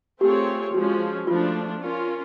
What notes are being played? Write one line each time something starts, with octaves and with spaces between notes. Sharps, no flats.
A3 C4 F4 G4 G#4 C#5
F3 G#3 C#4 F#4
F3 A3 D4 F4
C#4 F4 A#4